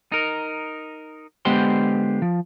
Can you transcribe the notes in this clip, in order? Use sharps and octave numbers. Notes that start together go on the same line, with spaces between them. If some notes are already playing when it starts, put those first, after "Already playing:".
D#4 A#4
D3 G#3 B3 G4 C5 C6
F3